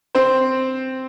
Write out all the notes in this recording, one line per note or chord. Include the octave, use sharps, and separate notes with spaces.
C4 C5